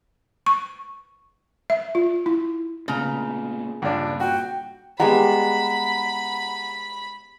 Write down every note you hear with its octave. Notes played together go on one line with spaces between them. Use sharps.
C#6
E5
F4
E4
A#2 C#3 A3 B3 A#5
C#2 G2 A#2 D4
F#4 G5
G3 G#3 B3 F#5 A#5 B5